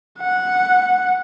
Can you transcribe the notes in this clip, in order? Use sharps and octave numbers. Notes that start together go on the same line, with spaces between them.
F#5